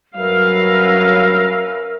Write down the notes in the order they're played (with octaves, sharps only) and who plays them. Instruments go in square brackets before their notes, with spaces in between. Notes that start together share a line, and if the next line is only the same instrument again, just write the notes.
[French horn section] G2 F#3 [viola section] C#4 B4 F5 [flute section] A#4 E5